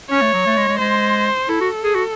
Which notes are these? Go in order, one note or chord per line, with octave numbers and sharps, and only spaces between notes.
C#4 C#5
A3
F#3
A3
G#3
G#3
G#3 C5
E4 A4
F#4
G#4
F#4